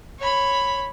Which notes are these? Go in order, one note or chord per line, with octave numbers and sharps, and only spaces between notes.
C#5 B5